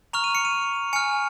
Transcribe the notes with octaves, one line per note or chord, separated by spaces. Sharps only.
A#5 C#6 F6 F7
D#7
C#7
D#7
G#5 F6 C#7